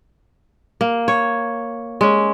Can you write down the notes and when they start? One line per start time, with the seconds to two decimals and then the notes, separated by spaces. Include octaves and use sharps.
0.81 A#3
1.08 C#5
2.01 G#3 C#4